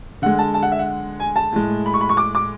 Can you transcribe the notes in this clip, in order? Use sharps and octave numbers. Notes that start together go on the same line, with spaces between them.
D3 G#3 F#5
A5
A5
F#5
E5
F#5
G#5
A5
A2 G#3
B5
C#6
B5
C#6
D6
D6